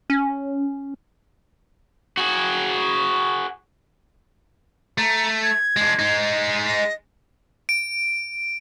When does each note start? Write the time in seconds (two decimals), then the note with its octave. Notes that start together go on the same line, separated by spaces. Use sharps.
0.10 C#4
2.17 F#4 G#4
4.98 A3 A#5
5.43 G#6
5.76 G#3 D4
5.99 G#3 D#4
6.67 D#5
7.69 D7